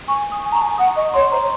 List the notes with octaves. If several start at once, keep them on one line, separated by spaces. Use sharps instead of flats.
G#5 C#6
D#6
G#5
A#5 C#6
G#5
F#5 D#6
D#5 C#6
C#5 C6
C5 A#5